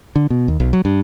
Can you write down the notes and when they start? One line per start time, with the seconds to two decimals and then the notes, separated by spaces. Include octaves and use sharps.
0.16 D3
0.30 B2
0.48 D#2
0.60 B1
0.73 F#3
0.85 G2